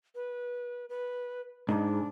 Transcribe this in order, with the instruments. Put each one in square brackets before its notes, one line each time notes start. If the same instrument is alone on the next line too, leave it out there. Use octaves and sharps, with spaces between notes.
[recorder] B4
B4
[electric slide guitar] G#2 [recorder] D4